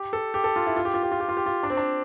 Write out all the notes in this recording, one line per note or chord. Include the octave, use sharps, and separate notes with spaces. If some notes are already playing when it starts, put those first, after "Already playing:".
Already playing: G4
A4
G4
A4
F4
E4
F4
G4
F4
G4
F4
G4
F4
G4
F4
D4
C4
D4